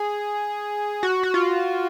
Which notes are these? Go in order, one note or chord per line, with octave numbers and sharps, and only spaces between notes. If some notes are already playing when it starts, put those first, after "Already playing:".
Already playing: G#4
F#4
F#4
F4